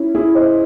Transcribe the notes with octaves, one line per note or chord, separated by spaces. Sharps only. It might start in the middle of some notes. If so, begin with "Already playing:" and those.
Already playing: C#4 E4
E4 G#4
C5 D#5